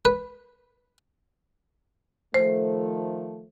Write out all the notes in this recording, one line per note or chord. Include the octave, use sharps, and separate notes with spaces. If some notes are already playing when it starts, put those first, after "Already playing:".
B4
D#3 F3 A3 C5